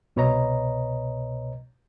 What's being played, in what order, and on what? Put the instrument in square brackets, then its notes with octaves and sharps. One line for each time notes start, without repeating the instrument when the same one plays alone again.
[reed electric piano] C2 B2 B4 C#5 D#5 A#5